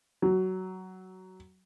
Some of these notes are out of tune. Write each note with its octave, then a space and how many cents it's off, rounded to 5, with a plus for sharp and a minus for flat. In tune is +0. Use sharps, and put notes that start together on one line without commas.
F#3 +15